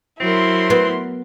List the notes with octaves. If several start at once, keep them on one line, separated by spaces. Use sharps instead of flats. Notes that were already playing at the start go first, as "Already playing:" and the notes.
F#3 C4 E4 A#4 C6
B3